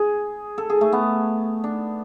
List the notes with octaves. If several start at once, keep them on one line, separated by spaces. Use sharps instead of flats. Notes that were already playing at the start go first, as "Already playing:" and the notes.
Already playing: G#4
A4
G#4
A3
B3
D4